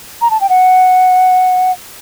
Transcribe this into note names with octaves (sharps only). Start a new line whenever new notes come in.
A#5
A5
G5
F#5